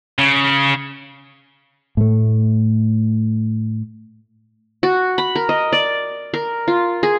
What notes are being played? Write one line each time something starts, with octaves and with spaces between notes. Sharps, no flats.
C#3
A2 A3
F#4
B5
A#4
D#5
D5
A#4
F4
G#4